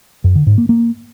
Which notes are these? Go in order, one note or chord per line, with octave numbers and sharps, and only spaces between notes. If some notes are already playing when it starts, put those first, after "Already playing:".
F#2
D3
G#2
A#3
A#3